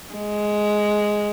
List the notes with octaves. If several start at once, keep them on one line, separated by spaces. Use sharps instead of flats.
G#3